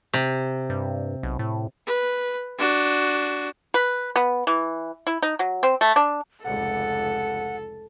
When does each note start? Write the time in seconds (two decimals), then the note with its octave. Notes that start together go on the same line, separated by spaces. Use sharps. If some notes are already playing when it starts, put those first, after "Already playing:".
0.13 C3
0.70 G2
1.23 B1
1.39 A2
1.87 B4
2.58 D4 F#4
3.74 B4
4.16 B3
4.47 E3
5.07 E4
5.22 D#4
5.39 F#3
5.63 C4
5.81 A3
5.96 D4
6.45 F1 C#2 A4 F#5